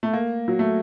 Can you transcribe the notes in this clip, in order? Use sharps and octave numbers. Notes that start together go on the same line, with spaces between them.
A3
A#3
F#3
A3